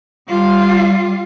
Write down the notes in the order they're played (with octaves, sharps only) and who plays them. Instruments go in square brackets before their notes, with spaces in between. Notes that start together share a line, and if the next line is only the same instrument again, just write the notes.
[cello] G3 F4